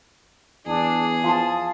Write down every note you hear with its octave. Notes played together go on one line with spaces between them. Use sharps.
E2 D4 G#4
F3 A5 C6 D#6